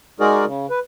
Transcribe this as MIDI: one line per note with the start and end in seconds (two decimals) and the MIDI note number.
0.20 0.45 56
0.20 0.45 63
0.20 0.45 66
0.20 0.45 68
0.20 0.45 70
0.20 0.45 74
0.45 0.66 49
0.70 0.79 71